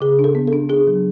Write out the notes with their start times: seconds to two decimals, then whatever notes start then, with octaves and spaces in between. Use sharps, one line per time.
0.01 C#3 G#4
0.19 D4
0.24 A4
0.35 B3
0.47 A4
0.53 D4
0.69 D4 G#4
0.87 F#3